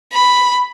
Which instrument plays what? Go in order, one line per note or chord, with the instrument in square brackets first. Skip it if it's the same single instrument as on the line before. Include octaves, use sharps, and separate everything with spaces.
[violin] B5